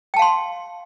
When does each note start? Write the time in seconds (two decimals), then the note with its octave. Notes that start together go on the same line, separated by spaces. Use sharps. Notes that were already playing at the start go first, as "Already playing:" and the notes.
0.14 G5
0.16 A5
0.19 F5
0.22 C6